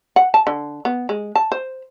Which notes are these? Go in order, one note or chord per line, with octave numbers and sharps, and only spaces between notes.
F#5
A5
D3
B3
G#3
A5
C5